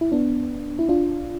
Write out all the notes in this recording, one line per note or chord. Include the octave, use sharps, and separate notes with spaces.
E4
B3 D4
E4
D4 F4